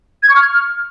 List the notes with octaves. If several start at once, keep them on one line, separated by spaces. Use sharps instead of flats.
G#6
C#6
F6